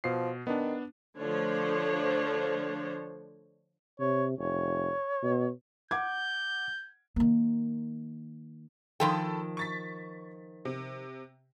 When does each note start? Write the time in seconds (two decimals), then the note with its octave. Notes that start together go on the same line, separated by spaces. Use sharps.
0.04 B2 F3 C7
0.47 D#3 B3 D4
1.19 D3 F3 A3 D4 C5 C#5
4.00 C3 C#5
4.38 F1 C#5
5.23 B2
5.91 F#5 D6 G6 G#6
7.16 D#3 A#3
9.00 D#3 F3 A4 G5 B5
9.57 C#6 A6 B6
10.65 C3